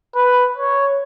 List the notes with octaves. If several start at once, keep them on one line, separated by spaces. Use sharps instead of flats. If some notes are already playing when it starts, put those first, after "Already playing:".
B4
C#5